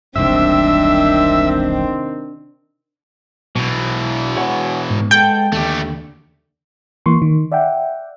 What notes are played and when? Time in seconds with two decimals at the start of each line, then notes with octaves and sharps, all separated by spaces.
0.16 E1 C2 G2 C3 D#3 C4 D4 E5
3.56 B1 B2 E3
4.36 G#4 C#5 F#5
4.90 G#2
5.11 G#3 B3 A4 G5 G6
5.53 D#2 D3 A3 G4
7.06 E3 A#3 C6 C#6
7.22 D#3
7.52 D5 E5 F#5 G5